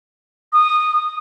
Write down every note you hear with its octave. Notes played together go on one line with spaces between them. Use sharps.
D#6